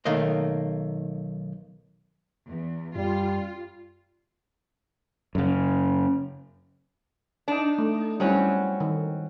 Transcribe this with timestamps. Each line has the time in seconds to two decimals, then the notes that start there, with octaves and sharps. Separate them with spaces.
0.05 B1 D#3 A3 A#3 D#5
2.46 E2
2.96 F#2 G3 F4
5.35 F#2 C#3
7.48 D4 D#4
7.78 A3
8.20 F#3 G3 C4 C#4 E4
8.80 D#3